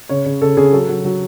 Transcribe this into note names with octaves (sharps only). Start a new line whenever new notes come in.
C#3 C#5
C#3
C#3 A4
C#3 G#4
F#3 A4
F#3
F#3